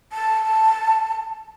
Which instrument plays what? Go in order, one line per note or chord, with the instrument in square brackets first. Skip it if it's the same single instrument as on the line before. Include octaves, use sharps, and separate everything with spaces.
[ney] A5